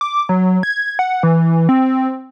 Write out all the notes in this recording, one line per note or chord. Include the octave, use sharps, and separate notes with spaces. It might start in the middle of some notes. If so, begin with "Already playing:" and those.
D6
F#3
G#6
F#5
E3
C4